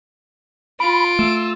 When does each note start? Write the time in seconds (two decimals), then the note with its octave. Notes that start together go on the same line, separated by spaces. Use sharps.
0.80 F4 B5 D7
1.19 A3 E6